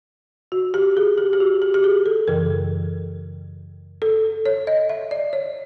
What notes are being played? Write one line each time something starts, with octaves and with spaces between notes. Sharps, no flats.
F#4
G4
G#4
G4
G4
F#4
G4
G4
G#4
A4
F#2 C#3 E3 A#4
A4
C#5
D#5
E5
D5
C#5